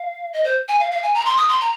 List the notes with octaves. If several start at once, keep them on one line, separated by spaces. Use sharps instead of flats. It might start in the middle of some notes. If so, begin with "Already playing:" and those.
Already playing: F5
D#5
C5
G#5
F5
F5
G#5
A#5
C6
D#6
C6
A#5